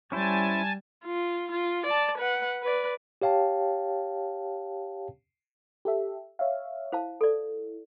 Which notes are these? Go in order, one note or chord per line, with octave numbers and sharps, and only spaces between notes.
G3 C#4 E4 C5 G#5 A5
F4
F4
D5 A5
B4 F#5
B4 D5
G4 C#5 F5 G5 A5
G4 A4 E5
C#5 E5 F5
E4 C5 F5 A5
A4 D5